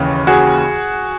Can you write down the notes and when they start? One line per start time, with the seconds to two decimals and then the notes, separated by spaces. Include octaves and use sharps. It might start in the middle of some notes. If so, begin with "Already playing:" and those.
Already playing: D#2 C#3 E3
0.27 F#4 G#4